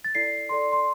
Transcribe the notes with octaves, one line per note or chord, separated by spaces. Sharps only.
A6
E4 A4 D5 C7
E4 A4 D5 C6
C6